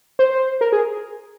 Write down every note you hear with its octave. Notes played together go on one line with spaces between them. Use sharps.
C5
A#4
G#4